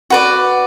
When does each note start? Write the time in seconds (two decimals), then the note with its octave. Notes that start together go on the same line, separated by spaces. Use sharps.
0.10 F#4 B4 D5